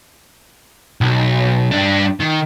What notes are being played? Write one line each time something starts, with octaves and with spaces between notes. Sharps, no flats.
B1
G2 D4
D#3